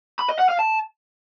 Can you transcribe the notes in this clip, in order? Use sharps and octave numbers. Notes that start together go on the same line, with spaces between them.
B5
D#5
F#5
F5
A5